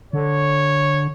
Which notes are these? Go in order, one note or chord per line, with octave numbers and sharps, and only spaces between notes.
D3 C#5